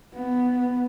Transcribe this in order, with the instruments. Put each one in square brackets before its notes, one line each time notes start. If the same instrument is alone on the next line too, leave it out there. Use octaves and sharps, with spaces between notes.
[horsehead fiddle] B3